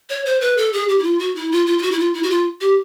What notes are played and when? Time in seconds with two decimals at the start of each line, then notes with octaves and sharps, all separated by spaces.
0.10 C#5
0.25 C5
0.41 B4
0.57 A4
0.73 G#4
0.88 G4
0.99 E4
1.04 F4
1.19 F#4
1.35 E4
1.52 F4
1.66 F4
1.78 F4
1.82 F#4
1.91 E4
1.99 F4
2.14 E4
2.23 F#4
2.30 F4
2.61 G4